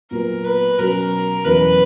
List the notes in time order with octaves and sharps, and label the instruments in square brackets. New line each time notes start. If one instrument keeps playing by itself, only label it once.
[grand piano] A#2 F#3 B3 [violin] A#4
[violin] B4
[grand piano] B2 F#3 C#4 F#4 [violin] A#4
[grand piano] E2 B2 F#3 C#4 E4 [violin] B4